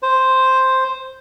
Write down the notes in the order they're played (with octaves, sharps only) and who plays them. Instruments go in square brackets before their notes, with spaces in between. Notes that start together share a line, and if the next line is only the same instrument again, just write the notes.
[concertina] C5